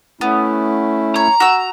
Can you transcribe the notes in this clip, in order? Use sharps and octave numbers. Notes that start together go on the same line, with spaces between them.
A3 B3 C#4 E4
C#5 A#5
F#4 E6